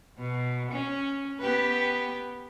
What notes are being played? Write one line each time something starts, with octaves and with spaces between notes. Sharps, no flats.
B2
C#4
B3 G4 B4